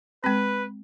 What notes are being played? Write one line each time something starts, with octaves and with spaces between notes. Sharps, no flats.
G#3 C4 B4